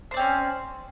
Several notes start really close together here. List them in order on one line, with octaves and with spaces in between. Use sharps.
C5 D5 C4 C#4